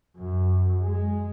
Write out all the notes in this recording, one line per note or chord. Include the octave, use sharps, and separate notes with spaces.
F#2
G#3